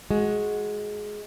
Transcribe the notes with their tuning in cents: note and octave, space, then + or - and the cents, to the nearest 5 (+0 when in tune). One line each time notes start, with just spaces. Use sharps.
G#3 +10 F#4 -10